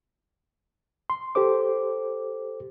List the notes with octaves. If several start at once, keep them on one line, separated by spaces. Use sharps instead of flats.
C6
G4 A4 C5 D6